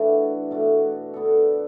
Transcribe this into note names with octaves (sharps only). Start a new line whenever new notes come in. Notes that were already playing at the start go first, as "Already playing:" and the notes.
Already playing: E3 A3 D4 E4 F#4
B2 A3 F#4
D3 B3 D4 A4